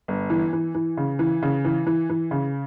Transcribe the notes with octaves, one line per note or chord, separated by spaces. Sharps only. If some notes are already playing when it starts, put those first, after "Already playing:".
G1
E3
E3
E3
C#3
E3
C#3
E3
E3
E3
C#3